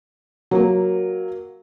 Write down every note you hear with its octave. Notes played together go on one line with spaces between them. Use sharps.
F#3 A#3 A#4